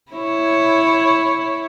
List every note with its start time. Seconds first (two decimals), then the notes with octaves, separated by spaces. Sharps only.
0.12 E4 C#5